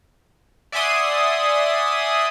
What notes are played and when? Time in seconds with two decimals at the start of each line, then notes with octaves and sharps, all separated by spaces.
0.72 D5 E5 F#5 G#5 C6 D#6